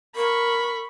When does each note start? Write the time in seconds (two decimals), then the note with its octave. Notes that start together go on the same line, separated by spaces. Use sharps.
0.16 A#4 B5 C#6